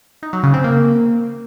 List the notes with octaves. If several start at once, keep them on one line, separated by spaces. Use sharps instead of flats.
D#4
F#3
C#3
C4
A#3